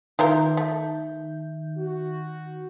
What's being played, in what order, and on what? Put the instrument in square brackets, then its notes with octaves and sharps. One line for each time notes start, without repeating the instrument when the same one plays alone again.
[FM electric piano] D#3 G6 [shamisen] E3 F4 A#4 [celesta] E5
[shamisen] A3
[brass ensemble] F#4